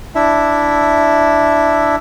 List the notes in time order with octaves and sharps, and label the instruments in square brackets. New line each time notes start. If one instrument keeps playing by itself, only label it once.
[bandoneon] D4 E4 E5